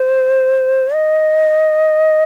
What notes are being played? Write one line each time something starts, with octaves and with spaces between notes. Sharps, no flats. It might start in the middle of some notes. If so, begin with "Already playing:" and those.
Already playing: C5
D#5